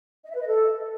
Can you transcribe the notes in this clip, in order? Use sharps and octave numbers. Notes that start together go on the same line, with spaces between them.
D#5
E5
B4
D#5
A4